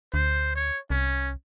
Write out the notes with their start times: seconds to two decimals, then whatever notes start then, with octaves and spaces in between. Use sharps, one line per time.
0.14 D2 C5
0.56 C#5
0.90 C2 C#4